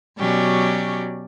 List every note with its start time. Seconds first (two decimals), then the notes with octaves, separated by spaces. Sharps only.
0.19 B2 F#3 C#4 G4 D5